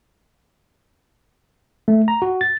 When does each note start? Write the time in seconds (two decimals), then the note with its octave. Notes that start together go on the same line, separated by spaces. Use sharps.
1.88 A3
2.08 A#5
2.22 F#4
2.41 A6